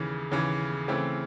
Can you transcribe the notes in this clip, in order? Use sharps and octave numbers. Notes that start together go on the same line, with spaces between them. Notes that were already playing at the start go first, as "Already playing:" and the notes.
Already playing: D#2 C#3 E3
D#2 C#3 E3
C#3 E3 A3 C4